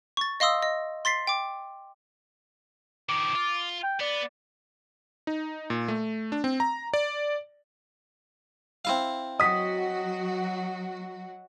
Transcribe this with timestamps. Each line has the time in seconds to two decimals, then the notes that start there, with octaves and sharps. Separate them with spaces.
0.17 C#6 A6
0.40 D#5 F5 C6 D#6 E6
0.62 D#5
1.05 C6 A6 B6 C7
1.27 G5 D6
3.09 D#3 F3 D6
3.35 F4
3.83 G5
4.00 B3 D5
5.27 D#4
5.70 A#2
5.88 A3
6.32 D4
6.44 C4
6.60 A#5
6.94 D5
8.85 C4 E4 F5
9.40 F#3 F#4 D#5 D#6 B6